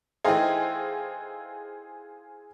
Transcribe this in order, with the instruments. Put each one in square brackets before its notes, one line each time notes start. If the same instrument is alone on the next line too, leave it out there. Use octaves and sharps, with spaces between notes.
[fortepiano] E3 A3 D#4 [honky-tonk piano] G#4 C5 F5 [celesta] E5 G5